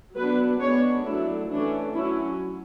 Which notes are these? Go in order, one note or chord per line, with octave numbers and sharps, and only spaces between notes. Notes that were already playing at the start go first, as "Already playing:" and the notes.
F#3 B3 D4 B4
G#3 B3 D4 C#5
F#3 A3 D4 E4
E3 A3 C#4 D4
F#3 C#4 E4